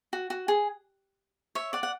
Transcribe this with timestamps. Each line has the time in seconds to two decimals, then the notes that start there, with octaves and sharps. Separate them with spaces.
0.13 F#4
0.30 F#4
0.48 G#4
1.55 C#5 E5
1.73 D5 F#5
1.83 F#5